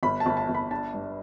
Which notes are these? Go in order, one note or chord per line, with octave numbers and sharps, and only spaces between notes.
G1 B5
A5
G1
A5
G1
B5
D4 A5
G2